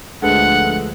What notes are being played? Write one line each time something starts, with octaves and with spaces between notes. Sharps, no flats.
D2 F3 G#3 A3 D4 A4 B4 F#5